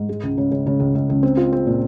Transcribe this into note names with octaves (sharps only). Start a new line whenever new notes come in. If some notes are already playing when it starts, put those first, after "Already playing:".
Already playing: G#2
G#3
C#2
C#3
C#3
C#3
C#2
C#2
C#2
C4
F4
C4
A#2